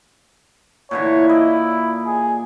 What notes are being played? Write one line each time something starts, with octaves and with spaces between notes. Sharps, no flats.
A#2 D3 E3 C#5
E4 D5 D#5
G#4